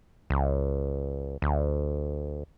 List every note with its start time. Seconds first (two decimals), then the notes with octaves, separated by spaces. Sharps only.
0.30 C#2
1.42 D2